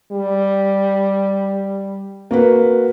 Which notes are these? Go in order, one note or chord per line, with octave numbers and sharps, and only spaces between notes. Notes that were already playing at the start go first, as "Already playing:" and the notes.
G3
A#3 F#4 B4